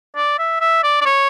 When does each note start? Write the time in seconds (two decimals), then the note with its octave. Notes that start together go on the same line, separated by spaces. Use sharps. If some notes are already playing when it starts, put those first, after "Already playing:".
0.16 D5
0.39 E5
0.61 E5
0.83 D5
1.01 D5
1.05 C#5